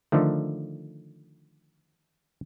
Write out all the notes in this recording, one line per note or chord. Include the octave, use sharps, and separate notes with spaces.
D3 D#3 F3 A3